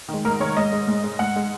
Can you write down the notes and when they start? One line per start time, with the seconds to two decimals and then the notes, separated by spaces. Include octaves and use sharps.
0.09 D#3
0.14 G#3
0.25 G#2 A#4
0.40 D#3 G#3 C#5
0.57 G#2 D#5
0.72 G#3
0.87 G#2
1.04 G#3
1.19 G#2 F#5
1.36 G#3